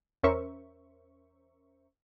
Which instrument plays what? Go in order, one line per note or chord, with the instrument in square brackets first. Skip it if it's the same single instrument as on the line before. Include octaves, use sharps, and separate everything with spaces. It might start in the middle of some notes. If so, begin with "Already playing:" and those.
[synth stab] E2 C#4 A#4 C5 E5 C#6